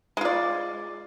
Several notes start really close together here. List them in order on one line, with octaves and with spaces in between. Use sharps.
G#3 F4 D5